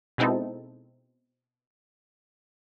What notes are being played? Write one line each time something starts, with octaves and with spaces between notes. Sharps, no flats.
B2 G#3 C4 D#4 E4 A4